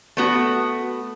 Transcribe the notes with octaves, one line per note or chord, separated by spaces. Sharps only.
A3 B3 F#4